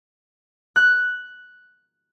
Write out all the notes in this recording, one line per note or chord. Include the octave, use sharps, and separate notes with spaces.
F#6